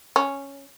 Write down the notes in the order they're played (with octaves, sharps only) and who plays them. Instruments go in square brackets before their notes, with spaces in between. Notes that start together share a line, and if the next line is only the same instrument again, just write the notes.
[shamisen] C#4